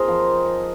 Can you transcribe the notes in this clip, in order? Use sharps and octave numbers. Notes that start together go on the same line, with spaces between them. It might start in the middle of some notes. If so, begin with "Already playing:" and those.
Already playing: C4 D#4 F4 G#4 A#4 C5
F3